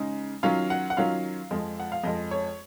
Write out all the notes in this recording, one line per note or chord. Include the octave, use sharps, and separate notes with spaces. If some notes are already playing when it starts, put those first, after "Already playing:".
Already playing: C#3 G#3 D#4
D#3 F#3 C#4 F4 F5
F#5
F#5
D#3 F#3 C#4 F4 F5
F2 F3 G#3
F#5
F5
F2 F3 G#3 D#5
C#5